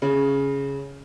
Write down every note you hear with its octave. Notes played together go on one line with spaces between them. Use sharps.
C#3